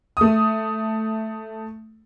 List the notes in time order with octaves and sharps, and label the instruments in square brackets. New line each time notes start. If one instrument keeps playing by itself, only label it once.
[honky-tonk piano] A3 D#6